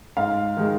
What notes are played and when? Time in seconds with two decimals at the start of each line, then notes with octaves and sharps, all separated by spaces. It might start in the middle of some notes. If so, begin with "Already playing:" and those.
0.17 G#2 F5
0.57 D#3 G#3